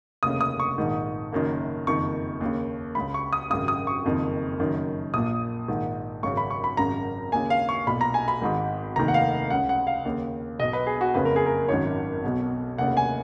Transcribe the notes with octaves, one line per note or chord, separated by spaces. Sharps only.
F1 D#2 C#3 D#6
D#6
C#6
A#1 G#2 D#3
F#1 F#2 D#3
F#1 F2 D#3 C#6
D#2 C#3
C#2 C#3 B5
C#6
D#6
G#1 F#2 C#3 D#6
D#6
C#6
F#1 F2 D#3
F#1 F#2 D#3
A#1 A#2 D#6
A#1 G#2 D#3
G#1 F#2 C#3 C#6
B5
C#6
B5
G#1 F#2 C#3 A#5
D#2 C#3 G#5
F5
C#6
B1 A#2 B5
A#5
G#5
B5
G#1 G#2 D#3
F1 D#2 D#3 A#5
F#5
F5
C#2 C#3 F#5
F#5
F5
D#2 C#3
B1 B2 D#5
B4
G#4
F#4
F#1 F2 C#3 B4
A#4
G#4
A#4
G#1 F#2 D#3 C#5
B1 B2
F1 D#2 C#3 F#5
G#5